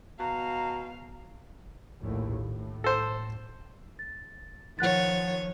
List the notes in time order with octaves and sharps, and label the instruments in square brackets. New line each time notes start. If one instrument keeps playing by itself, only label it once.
[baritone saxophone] B2 [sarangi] F5 [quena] A#5
[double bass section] A#1 D#2 A2
A2
[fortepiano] A4 C5
[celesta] A6
[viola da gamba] D#3 C#5 [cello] F3 [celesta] F#5 F#6 A6